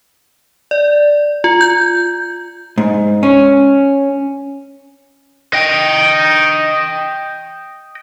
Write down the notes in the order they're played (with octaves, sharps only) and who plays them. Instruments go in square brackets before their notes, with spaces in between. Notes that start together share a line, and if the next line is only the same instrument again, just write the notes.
[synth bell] D5
F4
G6
[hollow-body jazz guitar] G#2
C#4
[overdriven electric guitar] D#5 G5